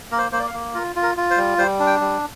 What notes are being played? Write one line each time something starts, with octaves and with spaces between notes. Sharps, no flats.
A#3 A#4
C5
A#3 C5
D5
F5
A#3
F4 A#4
F4
A#4
F4
C5
G3
G3 C5
D4
G5
G3